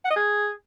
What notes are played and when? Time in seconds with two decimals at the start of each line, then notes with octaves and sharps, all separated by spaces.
0.05 F#5
0.10 D#5
0.16 G#4